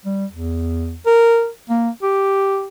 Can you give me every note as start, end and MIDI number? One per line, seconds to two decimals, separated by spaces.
0.05 0.26 55
0.31 0.98 40
1.06 1.49 70
1.69 1.89 58
2.02 2.68 67